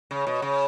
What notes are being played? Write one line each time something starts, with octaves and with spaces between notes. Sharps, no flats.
C#3
B2
C#3